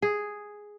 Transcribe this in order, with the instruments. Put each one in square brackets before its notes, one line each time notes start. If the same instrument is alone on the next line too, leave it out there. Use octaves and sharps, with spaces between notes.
[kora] G#4